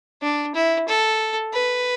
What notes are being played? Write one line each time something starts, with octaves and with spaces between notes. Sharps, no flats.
D4
E4
A4
B4